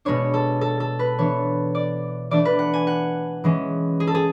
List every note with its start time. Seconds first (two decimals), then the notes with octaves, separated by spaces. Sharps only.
0.05 B2 G#3 B3 D4 C#5
0.34 A4
0.61 A4
0.80 A4
0.99 B4
1.18 E3 B3 D4 C#5
1.75 D5
2.31 E3 A3 D4 D5
2.45 B4
2.59 F#5
2.74 G#5
2.87 F#5
3.44 E3 G#3 C#4
4.00 G#4
4.07 A4
4.15 G#4